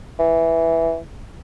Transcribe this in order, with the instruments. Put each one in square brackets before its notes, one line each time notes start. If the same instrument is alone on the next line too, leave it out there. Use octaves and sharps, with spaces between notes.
[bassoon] E3